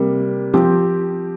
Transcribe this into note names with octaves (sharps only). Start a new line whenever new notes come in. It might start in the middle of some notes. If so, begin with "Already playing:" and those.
Already playing: C3 G3 A#3
F3 C4 G4